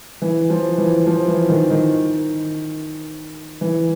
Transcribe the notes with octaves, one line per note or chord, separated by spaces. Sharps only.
E3
F3
E3
F3
E3
D#3
D#3
E3